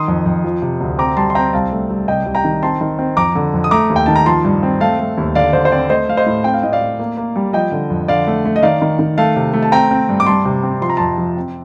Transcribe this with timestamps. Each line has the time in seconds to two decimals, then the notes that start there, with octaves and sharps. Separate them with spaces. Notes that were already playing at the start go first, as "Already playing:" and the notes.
Already playing: D#3 C6 D#6
0.08 F2
0.26 F2
0.44 F3
0.62 C3
0.80 D2
0.99 C4 A#5 D6
1.17 G3 A5 C6
1.30 C6
1.35 C4 G5 A#5
1.53 C2 F5 A5
1.72 A3
1.90 C2
2.08 C3 D#5 G5
2.26 C2
2.35 G5 A#5
2.45 D#3
2.62 C4 A5 C6
2.81 D#3
2.99 C4
3.17 F2 A#5 D6
3.35 D3
3.54 F2
3.64 D#6
3.71 A3 A#5 D6
3.90 D#2
3.96 G5
4.06 D#3 A5
4.16 A#5
4.26 F3 A5 C6
4.45 G2
4.63 C4
4.81 A3 F5 A5
4.99 A3
5.17 D#2
5.35 D3 D5 F5
5.53 D3 C5
5.65 C5
5.72 C4 D5
5.90 A3 C5 D#5
6.09 A3 F5
6.17 C5 D#5
6.26 A2
6.44 C4 G5
6.54 F5
6.63 A2 D#5
6.72 D5 F5
6.82 A2
7.00 A#3
7.17 A#3
7.36 G3
7.53 F3 D#5 G5
7.72 D3
7.90 F2
8.08 D3 D5 F5
8.27 A3
8.46 A3
8.56 D#5
8.63 D#3 D5 F5
8.82 D#3
8.99 D#3
9.18 A3 F5 A5
9.36 C3
9.54 A3
9.63 A5
9.72 C4 G5 A#5
9.91 C4
10.09 G2
10.20 D6
10.26 G3 A5 C6
10.45 C3
10.63 C4
10.81 F3 C6
10.90 A#5
10.97 F2 A5 C6
11.18 F3
11.37 C4